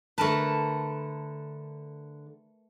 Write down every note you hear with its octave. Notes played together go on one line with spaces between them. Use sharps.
D3 A3 A#4 B4 A5